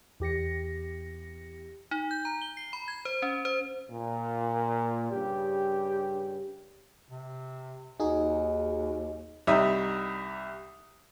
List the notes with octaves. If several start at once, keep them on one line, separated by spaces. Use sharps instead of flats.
E2 G4 A#6 C#7
D#4
G6
A#5
G7
C7
B5
G#6
C5
C#4
C5
A#2
G2 C#3 G4
C3
D#2 D#4 F#4 G#4 D#5
C2 G3 D#4 G4 E5 D#6